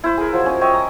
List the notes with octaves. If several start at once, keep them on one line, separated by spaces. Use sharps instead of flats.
E4 C5
G#4 A#4
F3 F#3
C#4 D#5
C#5 D#5 E5 G5
A#5